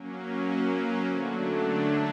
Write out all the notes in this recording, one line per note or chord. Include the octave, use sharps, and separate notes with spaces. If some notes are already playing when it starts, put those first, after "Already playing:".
Already playing: F#3 A#3 C#4
D#5
B4
D3 F#3 A3 D4 C5
C#5
D5